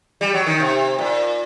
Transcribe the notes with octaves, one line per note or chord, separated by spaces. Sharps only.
G3
F#3
D#3
C3
A#2